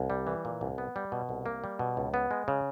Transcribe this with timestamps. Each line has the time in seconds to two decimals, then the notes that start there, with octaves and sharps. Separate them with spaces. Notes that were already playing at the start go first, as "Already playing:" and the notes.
Already playing: C2
0.10 G3
0.27 E3
0.45 A#2
0.61 C2
0.78 B3
0.96 G3
1.12 B2
1.29 C2
1.46 A#3
1.64 G3
1.79 B2
1.97 C#2
2.14 B3
2.31 G#3
2.48 C#3